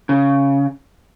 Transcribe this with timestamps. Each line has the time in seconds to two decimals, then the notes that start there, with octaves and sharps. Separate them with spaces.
0.09 C#3